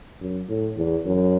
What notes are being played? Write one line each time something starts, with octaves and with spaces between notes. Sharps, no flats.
F#2
A2
E2
F#2